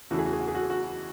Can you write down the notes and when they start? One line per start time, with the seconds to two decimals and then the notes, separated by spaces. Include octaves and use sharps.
0.10 E2 C#3 E3 A3 E4 F#4
0.18 G#4
0.26 F#4
0.33 G#4
0.40 F#4
0.48 G#4
0.55 F#4
0.62 G#4
0.70 F#4